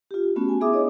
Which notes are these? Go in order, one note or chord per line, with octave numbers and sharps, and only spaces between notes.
F4 G4
A3 B3 C#4 F#4
G#5
B3 E4 G#4 E5 D6 D#6
B3 D4 C#5 D#5